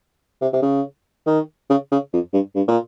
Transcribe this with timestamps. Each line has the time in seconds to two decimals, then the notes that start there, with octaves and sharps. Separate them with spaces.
0.41 C3
0.53 C3
0.62 C#3
1.27 D#3
1.70 C#3
1.92 C#3
2.13 F2
2.33 G2
2.55 G2
2.68 A#2